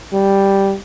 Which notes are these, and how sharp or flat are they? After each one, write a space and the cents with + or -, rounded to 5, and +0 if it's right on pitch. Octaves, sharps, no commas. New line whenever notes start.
G3 +0